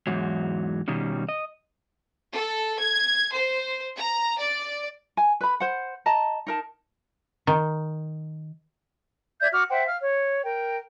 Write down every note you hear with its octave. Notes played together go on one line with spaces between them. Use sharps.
E2 G#2 F#3
B2 D#3 G3 C#4
D#5
A4
G#6
C5
A#5
D5
G#5
B4 B5
C5 F#5
D#5 A5 A#5
D#4 A#4 A5
D#3
D5 E5 G6 G#6
F#4 D6 F6
C5 E5 F#5 G5
F5 F6
C#5
A#4 G5